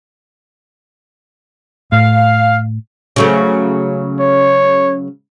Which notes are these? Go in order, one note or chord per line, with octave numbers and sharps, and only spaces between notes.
A2 F5
C#3 F#3 A3
C#5